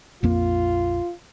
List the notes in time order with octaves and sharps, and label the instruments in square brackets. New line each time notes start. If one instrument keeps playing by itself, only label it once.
[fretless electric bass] A#1 F2 A#3 [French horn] F4